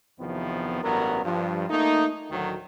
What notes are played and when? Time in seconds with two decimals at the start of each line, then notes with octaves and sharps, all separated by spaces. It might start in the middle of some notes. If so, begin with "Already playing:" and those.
0.20 E2 C3 D#3 F3 B3
0.83 A1 G2 F#3 B3 A#4
1.25 G2 F3
1.70 A3 A#3 D#4
2.31 D2 A2 D#3 F#3